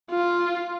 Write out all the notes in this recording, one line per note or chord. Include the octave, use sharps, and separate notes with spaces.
F4